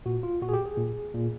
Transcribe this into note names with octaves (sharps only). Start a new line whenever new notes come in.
A#2 F#4
F4
A#2 F#4
G#4
G4
G#4
A#2
A#2